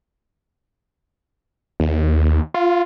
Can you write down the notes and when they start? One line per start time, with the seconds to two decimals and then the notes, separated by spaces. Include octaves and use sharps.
1.80 D#2
2.54 F4